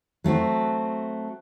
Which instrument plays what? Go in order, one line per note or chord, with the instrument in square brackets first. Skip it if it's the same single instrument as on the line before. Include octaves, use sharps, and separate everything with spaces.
[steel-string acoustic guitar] F#3 A3 C4 F#4